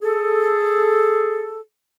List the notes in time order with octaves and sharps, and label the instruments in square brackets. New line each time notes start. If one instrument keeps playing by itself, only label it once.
[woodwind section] G#4 A4